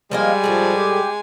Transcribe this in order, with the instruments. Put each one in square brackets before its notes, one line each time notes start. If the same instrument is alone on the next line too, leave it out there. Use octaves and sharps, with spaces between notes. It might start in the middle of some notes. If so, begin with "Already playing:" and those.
[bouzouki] F3 A#3 D#5 [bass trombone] G3 [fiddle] G#3 G#5
[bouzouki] A2 G#4 [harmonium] F3
[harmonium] G4